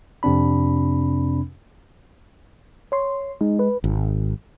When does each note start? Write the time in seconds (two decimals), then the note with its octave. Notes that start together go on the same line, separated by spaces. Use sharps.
0.23 F2 C3 C4 D4 B5
2.92 C#5 C6
3.41 G#3 D#4
3.59 B4
3.84 G#1